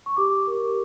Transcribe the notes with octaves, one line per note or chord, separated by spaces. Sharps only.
C#6
G4 D6
A#4